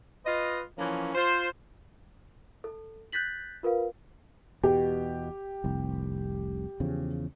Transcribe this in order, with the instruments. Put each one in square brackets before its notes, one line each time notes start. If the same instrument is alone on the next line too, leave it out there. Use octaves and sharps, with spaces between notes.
[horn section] F4 B4 D#5
E3 F3 A#3 C#4
F4 C5
[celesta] A4
F#6 G6 A6 B6 F#7
F4 A#4 B4 F5
[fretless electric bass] E2 B2 [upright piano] G4
[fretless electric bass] F1 C2
E2 C#3 F3